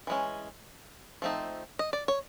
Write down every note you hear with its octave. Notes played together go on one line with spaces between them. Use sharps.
E3 G#3 C#4
F3 A3 C4 D#4
D#5
D5
C#5